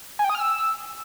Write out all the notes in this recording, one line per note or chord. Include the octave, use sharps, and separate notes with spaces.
G#5
G5
D#6
F6
E6